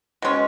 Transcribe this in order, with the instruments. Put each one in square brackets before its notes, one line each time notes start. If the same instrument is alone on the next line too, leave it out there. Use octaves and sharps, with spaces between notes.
[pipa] B2 G#3 C#4